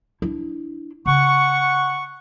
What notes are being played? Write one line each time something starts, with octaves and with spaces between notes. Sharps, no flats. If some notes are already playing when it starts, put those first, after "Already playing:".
D4 E4
C#3 F#5 C#6